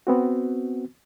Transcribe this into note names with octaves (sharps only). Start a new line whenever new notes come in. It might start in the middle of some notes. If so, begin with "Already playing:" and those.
B3 C4 F#4